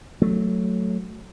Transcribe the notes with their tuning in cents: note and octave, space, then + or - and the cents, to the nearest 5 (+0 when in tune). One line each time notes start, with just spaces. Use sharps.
F#3 +0 A3 +0